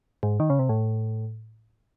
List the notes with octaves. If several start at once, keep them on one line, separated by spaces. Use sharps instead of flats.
G#2
D#3
C#3
C3
A2